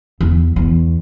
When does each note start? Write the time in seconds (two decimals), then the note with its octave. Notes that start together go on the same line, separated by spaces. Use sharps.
0.21 E2
0.56 E2